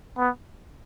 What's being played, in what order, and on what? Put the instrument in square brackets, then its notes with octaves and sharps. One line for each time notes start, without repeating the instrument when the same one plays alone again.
[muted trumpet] B3